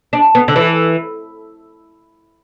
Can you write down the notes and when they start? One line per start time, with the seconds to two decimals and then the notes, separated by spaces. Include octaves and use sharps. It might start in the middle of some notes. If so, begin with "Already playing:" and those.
0.13 D4
0.35 B3
0.48 D3
0.56 E3